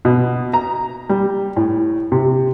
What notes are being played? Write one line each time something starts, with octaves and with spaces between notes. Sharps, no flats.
B2
A#5
G3
A2
C3